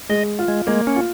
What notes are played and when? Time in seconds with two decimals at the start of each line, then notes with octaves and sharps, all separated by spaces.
0.09 G#3 D#5
0.39 F4
0.48 G#3
0.67 G#3 A#3
0.87 C#4
0.96 F4